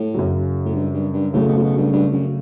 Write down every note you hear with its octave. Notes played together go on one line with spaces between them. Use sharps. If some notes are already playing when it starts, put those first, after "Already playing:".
Already playing: A2
F#2 C#3 F#3
A2
G2
G2
G2
A2 C#3 F#3 A3
B2
A2
B2
G2
G2
F#2